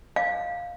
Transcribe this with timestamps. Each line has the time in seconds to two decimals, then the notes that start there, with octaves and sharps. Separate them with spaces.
0.16 F5